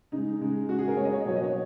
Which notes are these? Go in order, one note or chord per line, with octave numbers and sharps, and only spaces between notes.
C#3 G#3 D#4
C#3 G#3
C#3 G#3 F#4
G#4
A#4
C#3 G#3 C#5
D#5
C#5
D#5
B2 F#3 A#3 C#5
D#5
C#5